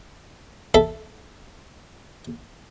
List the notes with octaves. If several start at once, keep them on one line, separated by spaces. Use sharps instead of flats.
A4 E5